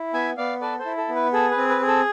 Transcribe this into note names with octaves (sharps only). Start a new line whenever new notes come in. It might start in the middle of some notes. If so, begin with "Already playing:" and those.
Already playing: E4
B3 E5 G#5
B3 D5 F5
A4 B4 D5
A4 C5
E4
A4
B3
B4
G#4 A4
B4
C4
B4
G#4
A4